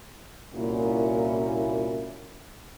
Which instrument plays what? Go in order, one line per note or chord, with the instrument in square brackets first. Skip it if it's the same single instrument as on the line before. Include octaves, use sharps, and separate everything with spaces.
[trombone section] C2 A#2 A#3 C#4 E4 F#4